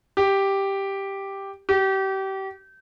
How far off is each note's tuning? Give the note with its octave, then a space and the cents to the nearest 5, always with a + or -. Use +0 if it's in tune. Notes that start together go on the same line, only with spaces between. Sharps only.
G4 +0
G4 -30